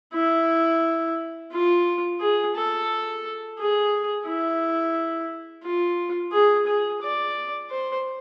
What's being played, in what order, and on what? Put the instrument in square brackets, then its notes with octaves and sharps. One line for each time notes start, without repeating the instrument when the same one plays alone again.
[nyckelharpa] E4
F4
G#4
A4
G#4
E4
F4
G#4
G#4
D5
C5